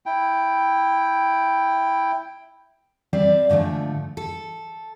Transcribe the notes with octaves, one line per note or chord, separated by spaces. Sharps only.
E4 G5
G3 C4 D5 E5 F5
G#2 D3 F3 A3
A4